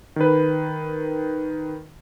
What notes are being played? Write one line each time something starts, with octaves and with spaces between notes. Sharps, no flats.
D#3 B4